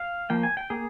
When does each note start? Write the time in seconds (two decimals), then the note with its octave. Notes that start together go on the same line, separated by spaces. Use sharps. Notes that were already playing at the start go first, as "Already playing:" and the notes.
Already playing: F5
0.30 F3 A#3 G5
0.43 G#5
0.57 G5
0.70 A#3 G#4